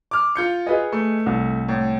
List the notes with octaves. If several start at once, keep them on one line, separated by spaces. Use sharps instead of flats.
D6 F6
F4 G6 C#7
G#4 B4 D#5
A3
C2
A2